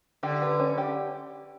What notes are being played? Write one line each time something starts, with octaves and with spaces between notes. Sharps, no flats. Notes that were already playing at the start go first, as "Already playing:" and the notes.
D3 G4
B4
C#4
G4